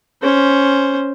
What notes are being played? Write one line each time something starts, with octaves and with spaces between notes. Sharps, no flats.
C#4 C5